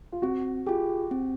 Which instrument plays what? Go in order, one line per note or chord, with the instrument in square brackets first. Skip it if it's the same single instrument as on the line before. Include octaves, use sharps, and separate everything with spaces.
[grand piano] F4
[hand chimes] C4 [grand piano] F#4
[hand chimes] F4 G#4 [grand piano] G4
[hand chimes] C4